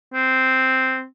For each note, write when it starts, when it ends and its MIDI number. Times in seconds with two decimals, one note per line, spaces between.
0.13 1.05 60